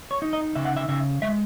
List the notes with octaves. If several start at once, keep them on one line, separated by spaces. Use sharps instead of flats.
C#5
D#4
D#5
C#3 E5
F#5
E5
C#3 E5
G#3 E5